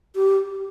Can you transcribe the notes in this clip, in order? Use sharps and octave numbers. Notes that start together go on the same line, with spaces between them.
G4